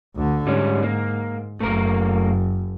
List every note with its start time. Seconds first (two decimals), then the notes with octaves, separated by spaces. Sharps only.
0.16 D2 D3
0.47 G#2 G3 C#4
0.83 A#3
1.60 F#1 A3 A#3 A#4